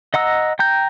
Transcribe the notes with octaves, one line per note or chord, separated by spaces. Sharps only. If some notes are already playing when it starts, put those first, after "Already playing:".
D#5 F#5 A#5 E6
G5 A#5 G6